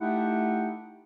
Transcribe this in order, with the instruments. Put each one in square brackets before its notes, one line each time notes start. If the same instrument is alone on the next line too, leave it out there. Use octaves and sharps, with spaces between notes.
[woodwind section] A3 D#4 E4 G4 F#5 G5